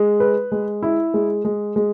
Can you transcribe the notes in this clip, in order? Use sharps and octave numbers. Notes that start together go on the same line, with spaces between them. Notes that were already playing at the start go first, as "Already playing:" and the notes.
Already playing: G#3
B4
G#3
E4
G#3
G#3
G#3